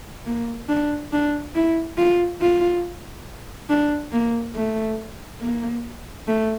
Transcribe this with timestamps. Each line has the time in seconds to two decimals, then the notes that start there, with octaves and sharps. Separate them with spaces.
0.26 A#3
0.69 D4
1.13 D4
1.55 E4
1.98 F4
2.41 F4
3.70 D4
4.12 A#3
4.56 A3
5.41 A#3
6.27 A3